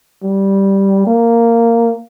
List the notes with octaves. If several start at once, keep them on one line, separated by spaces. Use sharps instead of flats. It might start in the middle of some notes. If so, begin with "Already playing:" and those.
G3
A#3